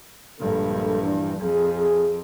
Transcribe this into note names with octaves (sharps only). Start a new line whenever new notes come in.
A#1 G2 D3 G#3 A4
E3 D4
F2 G#4